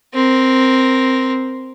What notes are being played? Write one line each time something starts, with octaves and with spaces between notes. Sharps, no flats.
C4 A#4